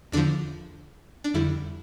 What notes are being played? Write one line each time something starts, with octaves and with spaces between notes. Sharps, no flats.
E2 D3 F3 D4
D4
F2 D3 G3 E4